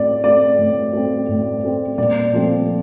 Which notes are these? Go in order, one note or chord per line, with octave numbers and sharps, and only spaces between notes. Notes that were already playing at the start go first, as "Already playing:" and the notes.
Already playing: A2 A3 C4 D5
A3 C4 D5
A2
A3 C4
A2
A3 C4
A#2 D5
F3 A3 C4